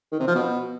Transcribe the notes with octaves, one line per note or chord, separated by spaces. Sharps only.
D#3
C3
F3
B2